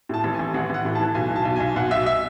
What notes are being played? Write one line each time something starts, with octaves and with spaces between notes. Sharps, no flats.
A2 A5
A1
G#5
A1
A1 F#5
A1 F#5
A2
E3 A5
B1 G#5
B1
A5
B1
B1 G#5
B1 F#5
B1 E5
E5